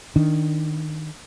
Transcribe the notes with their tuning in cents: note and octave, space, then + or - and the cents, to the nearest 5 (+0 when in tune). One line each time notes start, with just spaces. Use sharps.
D#3 +0 D4 +0